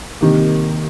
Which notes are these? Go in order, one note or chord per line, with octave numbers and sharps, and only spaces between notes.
C3 D#3 G3 A#3